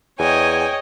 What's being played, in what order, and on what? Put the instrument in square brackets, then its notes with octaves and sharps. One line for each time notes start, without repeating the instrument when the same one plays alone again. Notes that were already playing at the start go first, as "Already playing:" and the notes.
[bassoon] E2 [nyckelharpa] C#5 D#5 [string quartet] G5 G#5